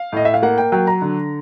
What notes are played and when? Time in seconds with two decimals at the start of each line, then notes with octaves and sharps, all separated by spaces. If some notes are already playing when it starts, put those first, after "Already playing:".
Already playing: F5
0.12 A2 D#5
0.25 E5
0.34 F5
0.42 A#3 F#5
0.58 G5
0.72 F#3 G5
0.87 A#5
1.02 D3